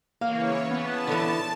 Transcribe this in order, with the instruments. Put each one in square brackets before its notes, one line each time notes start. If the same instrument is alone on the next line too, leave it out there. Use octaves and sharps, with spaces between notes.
[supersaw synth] C#3 E3 C#5 [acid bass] A#3 [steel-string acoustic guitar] F5
[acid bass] B3 [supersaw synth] A5
[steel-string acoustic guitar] D3 E3